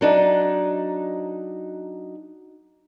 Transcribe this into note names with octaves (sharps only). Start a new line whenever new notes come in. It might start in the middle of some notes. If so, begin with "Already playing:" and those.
F#3 D4 D#4